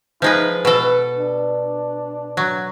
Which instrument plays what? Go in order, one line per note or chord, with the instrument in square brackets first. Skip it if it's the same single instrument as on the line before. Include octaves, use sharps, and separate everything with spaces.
[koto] F3 G#3 B4 [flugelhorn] D#4
[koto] B2 A4 [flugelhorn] B4
[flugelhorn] D4
[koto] F#3